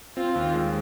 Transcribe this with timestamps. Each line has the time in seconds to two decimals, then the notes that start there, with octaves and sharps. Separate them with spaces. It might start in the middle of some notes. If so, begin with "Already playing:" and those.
0.17 C4 F4
0.35 D#2
0.54 G#3